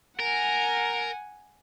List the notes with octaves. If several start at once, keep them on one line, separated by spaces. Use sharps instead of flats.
A#4 F#5 G#5